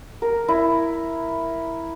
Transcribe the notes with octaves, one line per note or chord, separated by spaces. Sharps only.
A#4
E4